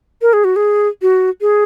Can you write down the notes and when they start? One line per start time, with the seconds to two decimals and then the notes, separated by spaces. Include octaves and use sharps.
0.22 A#4
0.33 G#4
0.44 F#4
0.56 G#4
1.02 F#4
1.41 G#4